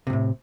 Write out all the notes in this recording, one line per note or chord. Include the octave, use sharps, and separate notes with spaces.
F2 A2 C3